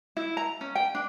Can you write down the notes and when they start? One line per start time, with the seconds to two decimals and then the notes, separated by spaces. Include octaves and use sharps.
0.17 E4
0.37 A#5
0.61 C#4
0.75 G5
0.95 D4